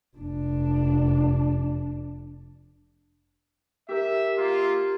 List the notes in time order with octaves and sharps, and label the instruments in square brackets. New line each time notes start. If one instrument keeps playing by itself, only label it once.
[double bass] F1 D4
[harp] G4 A#4 [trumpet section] E5
[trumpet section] A#3 F4